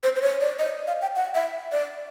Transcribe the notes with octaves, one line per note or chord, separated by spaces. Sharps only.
C5
C5
C#5
D5
D#5
F5
G5
F#5
E5
D5